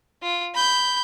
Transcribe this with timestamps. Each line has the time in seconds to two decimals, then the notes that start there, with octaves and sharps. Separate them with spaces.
0.23 F4
0.55 B5 G6